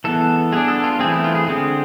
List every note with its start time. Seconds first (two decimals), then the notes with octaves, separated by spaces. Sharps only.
0.04 E3 G#3 B3 A4
0.52 G#3 B3 D4 G#4
0.68 A4
0.84 F4
0.99 E3 A3 C4 G#4
1.11 E4
1.24 F4
1.35 G#4
1.47 D3 G#3 C4 G#4